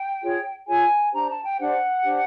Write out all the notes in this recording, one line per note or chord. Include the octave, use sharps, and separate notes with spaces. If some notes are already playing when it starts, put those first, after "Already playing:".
Already playing: G5
F4 G#4 C#5
F4 G#4 C#5 G#5
D4 G4 C5 A#5
A5
G5
D4 G4 C5 F#5
D4 G4 C5